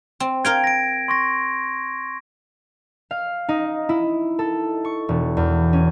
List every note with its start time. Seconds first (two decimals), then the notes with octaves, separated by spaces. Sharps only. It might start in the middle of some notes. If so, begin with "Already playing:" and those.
0.20 C4
0.45 A#4 F5 G5 G#6 D7
0.64 A#6 D7
1.08 C6 C#6 A#6
3.11 F5
3.49 D#4
3.89 E4
4.39 A4
4.85 C#6
5.09 E1
5.37 E2
5.73 C#4